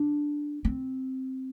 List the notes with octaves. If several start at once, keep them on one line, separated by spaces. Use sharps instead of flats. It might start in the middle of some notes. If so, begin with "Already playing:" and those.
Already playing: D4
C4